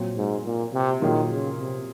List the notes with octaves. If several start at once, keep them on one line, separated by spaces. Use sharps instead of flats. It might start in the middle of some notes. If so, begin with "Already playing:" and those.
Already playing: A#2 F#3 C4
G#2
A#2
C3
A#2 D#3 F#3 A#3 F4 G#4
C#3
C3